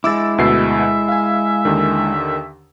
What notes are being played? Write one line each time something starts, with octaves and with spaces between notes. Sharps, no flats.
G#3 E4 D6 E6 A6
D2 B2 E5 C7
F5 G#5
D#2 D3 D#3